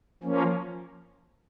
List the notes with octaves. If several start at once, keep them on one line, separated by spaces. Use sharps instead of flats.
F3 A#3 C#4